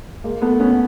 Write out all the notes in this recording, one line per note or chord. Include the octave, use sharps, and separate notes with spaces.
G#3 A#3
A3 B3
B3 C#4